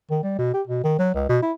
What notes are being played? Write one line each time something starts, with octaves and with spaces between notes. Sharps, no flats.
D#3
G3
B2
G4
B2
D#3
F#3
C#2
B2
E4